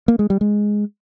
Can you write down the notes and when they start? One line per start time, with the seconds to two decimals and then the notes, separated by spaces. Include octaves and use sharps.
0.08 A#3
0.19 G#3
0.30 G3
0.41 G#3